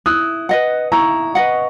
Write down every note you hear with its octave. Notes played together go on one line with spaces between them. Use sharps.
E4 D#6 F#6
B4 D#5 F#5
E4 A#5 C#6
B4 D#5 F#5